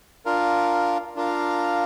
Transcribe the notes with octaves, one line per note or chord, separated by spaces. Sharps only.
D4 F4 A#4 F5
D4 F4 A#4 F5